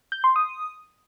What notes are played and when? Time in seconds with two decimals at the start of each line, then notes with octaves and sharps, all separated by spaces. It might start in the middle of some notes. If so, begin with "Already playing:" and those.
0.12 G6
0.24 C6
0.36 D#6